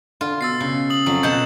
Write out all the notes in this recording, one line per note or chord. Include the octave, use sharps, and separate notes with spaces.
D3 F4
B2 E6 A6 C7
C#3
D#6 F#7
F2 F#3
B2 F#5 A5 G6 E7